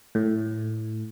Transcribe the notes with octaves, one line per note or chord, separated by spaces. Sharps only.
A2